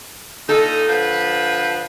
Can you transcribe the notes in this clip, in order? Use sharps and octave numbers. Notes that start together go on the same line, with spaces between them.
A#2 D#4 A4
D3 F3 B4